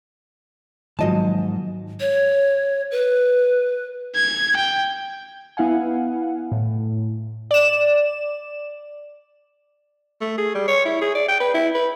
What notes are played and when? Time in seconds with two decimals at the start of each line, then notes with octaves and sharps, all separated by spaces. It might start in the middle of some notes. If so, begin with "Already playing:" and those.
0.99 G#2 D#3 F3 F#3 G#3 A#3 D#5 A5
2.00 C#5
2.92 B4
4.15 G#6
4.57 G5
5.57 B3 E4 F5 F#5 G#5
6.52 A2
7.51 D5 E7
10.21 A3
10.38 G#4
10.55 G3
10.68 C#5
10.85 E4
11.01 G#4
11.15 D5
11.28 G5
11.40 B4
11.54 E4
11.75 B4